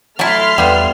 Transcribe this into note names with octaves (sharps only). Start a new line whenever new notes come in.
F#3 A3 E4 G#5 A5 C6 F6
E2 G3 B3 F4